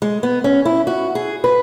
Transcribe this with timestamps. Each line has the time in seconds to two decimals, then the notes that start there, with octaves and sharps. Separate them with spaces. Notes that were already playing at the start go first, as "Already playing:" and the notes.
0.02 G#3
0.23 B3
0.44 C#4
0.65 E4
0.87 F#4
1.15 G#4
1.44 B4